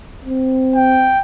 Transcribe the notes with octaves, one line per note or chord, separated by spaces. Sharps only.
C4
G5